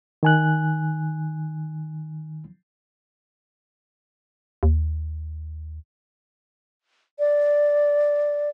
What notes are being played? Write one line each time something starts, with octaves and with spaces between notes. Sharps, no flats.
D#3 G#5 F#6
D#2
D5